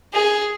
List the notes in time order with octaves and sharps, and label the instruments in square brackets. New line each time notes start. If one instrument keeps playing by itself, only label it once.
[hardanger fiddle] G#4